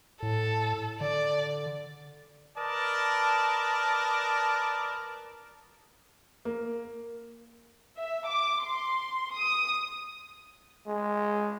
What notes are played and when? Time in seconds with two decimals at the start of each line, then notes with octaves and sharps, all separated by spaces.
0.22 A2 A4
1.01 D3 D5
2.58 A#4 B4 D5 D#5 A5
6.45 A#3
7.98 E5
8.27 D6
8.64 C6
9.35 D#6
10.87 G#3